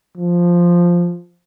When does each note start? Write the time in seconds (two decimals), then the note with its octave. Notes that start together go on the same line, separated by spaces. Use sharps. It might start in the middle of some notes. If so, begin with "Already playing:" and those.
0.17 F3